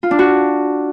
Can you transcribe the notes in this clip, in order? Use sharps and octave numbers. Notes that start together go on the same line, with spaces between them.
F4
D4
F#4